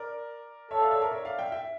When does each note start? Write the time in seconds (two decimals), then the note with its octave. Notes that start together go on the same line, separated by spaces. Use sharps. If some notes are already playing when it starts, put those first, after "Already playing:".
Already playing: A#4 D5
0.71 A4 C#5 E5
0.81 D5 F5
0.91 C#5 E5
1.01 A#4 D5
1.11 C#5 E5
1.25 D5 F5
1.39 E5 G5
1.52 E5 G5